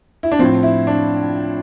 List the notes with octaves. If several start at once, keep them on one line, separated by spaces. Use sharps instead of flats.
E4
D4
A2 F3 C4
E4
D4